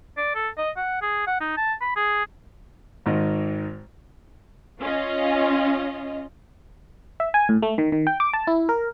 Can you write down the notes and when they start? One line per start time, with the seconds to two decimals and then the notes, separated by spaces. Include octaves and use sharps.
0.17 D5
0.35 A4
0.58 D#5
0.77 F#5
1.02 G#4
1.27 F#5
1.40 D#4
1.57 A5
1.81 B5
1.96 G#4
3.06 G#1 G#2 D#3 D#5
4.81 C#4 F4 D#5
7.20 E5
7.34 G#5
7.49 A2
7.62 A3
7.78 D#3
7.92 D#3
8.07 G5
8.20 D6
8.33 A5
8.47 E4
8.69 A#4